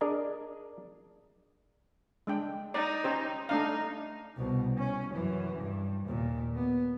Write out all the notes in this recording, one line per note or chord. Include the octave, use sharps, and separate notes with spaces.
D4 G#4 A#4 D5 D#5 G#5
G#3 D4 G5
D#4 D5
C#4 G4 C5
A3 D4 D#4 F5
C2 B2
C#4
F#2 E3
G2
D#2 A#2
B3